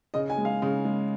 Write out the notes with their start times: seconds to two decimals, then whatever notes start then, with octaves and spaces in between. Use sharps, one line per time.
0.14 C#3 D#5
0.30 G#5
0.38 G#3
0.45 F5
0.62 C#3
0.85 G#3